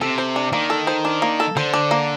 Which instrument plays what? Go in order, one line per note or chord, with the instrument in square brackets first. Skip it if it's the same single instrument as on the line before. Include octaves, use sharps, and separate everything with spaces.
[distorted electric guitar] C3 [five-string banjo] A4
[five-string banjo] C5
D4
[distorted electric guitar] D#3 [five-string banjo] A#3
[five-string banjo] A4
C5
D4
A#3
A4
[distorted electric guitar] D3 [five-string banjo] C5
[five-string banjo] D4
A#3